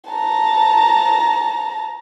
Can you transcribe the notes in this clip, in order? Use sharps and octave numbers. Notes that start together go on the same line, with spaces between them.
A5 A#5